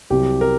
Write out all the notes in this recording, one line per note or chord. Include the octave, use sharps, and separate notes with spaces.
C2 C3 F#3 G4
A#4